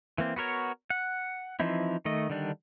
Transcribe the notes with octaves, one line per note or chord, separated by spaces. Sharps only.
E3 A#3 C4
B3 F#4 A#4 C#5
F#5
E3 F3 C4 D#4 E4
D#3 A3 D#5
D3 D#3 G3 D4